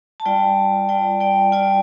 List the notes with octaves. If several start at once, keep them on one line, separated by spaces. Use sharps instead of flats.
A5
G3 F4 D5 G5
G3 F4 D5 G5
D5 G5
G3 F4 D5 G5